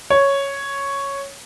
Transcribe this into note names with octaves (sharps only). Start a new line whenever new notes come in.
C#5